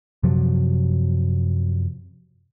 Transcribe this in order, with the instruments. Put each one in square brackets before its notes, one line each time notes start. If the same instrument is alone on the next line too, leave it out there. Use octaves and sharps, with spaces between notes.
[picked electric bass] F#2 C3 F3 F#3